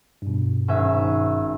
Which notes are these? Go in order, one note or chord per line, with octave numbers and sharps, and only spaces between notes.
G2 B2
G#1 C#4 E5